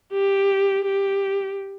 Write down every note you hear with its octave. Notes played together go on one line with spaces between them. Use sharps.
G4
G4